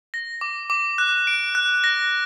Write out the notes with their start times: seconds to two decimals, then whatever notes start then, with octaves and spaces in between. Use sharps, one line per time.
0.14 A#6
0.41 D6
0.70 D6
0.98 F#6
1.27 D7
1.55 F#6
1.84 A#6